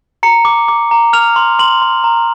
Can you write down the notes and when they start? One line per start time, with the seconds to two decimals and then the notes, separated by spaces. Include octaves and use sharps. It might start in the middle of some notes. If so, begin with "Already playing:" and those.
0.23 A#5 C#7
0.45 D6
0.68 D6
0.91 A#5
1.13 F6 F7
1.36 C6
1.59 C6 F#7
1.82 C6
2.04 A#5